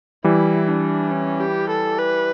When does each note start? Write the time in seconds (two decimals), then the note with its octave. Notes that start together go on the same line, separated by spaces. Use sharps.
0.24 E3 G3 E4
0.68 D4
1.11 C#4
1.41 G4
1.70 A4
1.98 B4